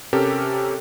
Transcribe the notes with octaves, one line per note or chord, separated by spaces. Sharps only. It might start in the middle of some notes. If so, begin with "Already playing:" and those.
C3 C#4 G4 A4 A#4